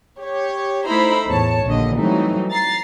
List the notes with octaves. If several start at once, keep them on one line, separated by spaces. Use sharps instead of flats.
G4 C#5
A3 D#4 E4 C5 A#5 B5
E2 A2 C#5 A5
A#1 D#2 A#2 D3 D#5
E3 F#3 G3 A3 C4 D#4
A#5 A6 C7